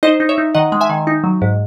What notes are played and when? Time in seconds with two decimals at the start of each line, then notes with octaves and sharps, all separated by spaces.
0.03 D#4 C5 D#5
0.20 D#4
0.29 C#5 E5
0.38 D#4
0.55 D#3 D#5 F#5
0.72 G#3
0.81 E5 G#5
0.90 D#3
1.07 D#4
1.24 F#3
1.42 G#2